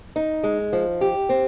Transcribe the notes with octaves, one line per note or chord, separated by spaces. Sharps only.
D#4
G#3
F3
G4
C4